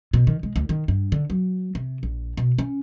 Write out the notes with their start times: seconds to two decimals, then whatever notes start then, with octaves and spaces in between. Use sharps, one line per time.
0.13 B2
0.27 D#3
0.43 G#3
0.56 D2
0.69 D#3
0.88 G2
1.12 D3
1.30 F#3
1.75 C3
2.03 A#1
2.37 B2
2.58 C#4